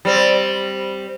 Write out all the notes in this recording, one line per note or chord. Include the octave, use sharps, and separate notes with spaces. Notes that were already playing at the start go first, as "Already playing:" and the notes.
G3 C4